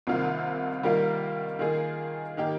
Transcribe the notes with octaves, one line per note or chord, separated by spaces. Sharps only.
C2 C3 D#3 A#3 F4
D#3 G3 A#3 F4 A#4
D#3 A#3 F4 G#4
D#3 A#3 D#4 G4